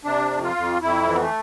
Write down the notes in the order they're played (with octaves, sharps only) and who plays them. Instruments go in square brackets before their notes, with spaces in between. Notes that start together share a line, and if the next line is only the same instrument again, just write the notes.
[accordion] C3 D4
F2
F4
F2
F2 E4
E3
B3
A3